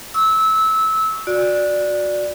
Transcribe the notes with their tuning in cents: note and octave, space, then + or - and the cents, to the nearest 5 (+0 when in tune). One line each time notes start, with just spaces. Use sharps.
C#6 +20 E6 -20
F#4 -25 D5 +0